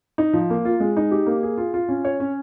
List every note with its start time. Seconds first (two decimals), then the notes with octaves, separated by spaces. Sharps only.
0.18 D#4
0.33 F3
0.50 A#3
0.65 F4
0.80 G#3
0.97 D#4
1.11 G4
1.27 A#3
1.43 G#4
1.57 F4
1.74 F4
1.89 C#4
2.05 C#5
2.20 C#4